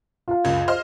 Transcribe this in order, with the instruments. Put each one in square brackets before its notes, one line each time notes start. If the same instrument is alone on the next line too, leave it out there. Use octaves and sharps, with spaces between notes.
[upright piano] F4 F5
[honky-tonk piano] F#1 C#2 G#6
C5 D#5 F6